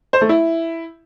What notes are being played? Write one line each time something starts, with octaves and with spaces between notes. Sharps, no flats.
C5
A3
E4